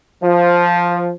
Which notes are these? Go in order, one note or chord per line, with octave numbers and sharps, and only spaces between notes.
F3